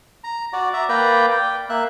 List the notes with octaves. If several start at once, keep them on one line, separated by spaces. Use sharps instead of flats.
A#5
F#4 D5
E5 A#5
A#3 B4 D5 G5 A#5
G5
A#3 E5 F#6